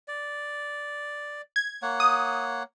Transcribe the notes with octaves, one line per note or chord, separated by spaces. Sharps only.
D5
G#6
A#3 C#5 F#5
D#6